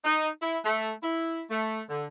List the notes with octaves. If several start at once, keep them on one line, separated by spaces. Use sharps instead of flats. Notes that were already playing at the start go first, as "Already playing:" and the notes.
D#4
E4
A3
E4
A3
D3